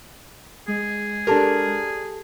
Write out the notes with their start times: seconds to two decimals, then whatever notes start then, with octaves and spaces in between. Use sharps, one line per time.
0.68 G#3 G#4
1.27 D4 G4 A4 A#4 A5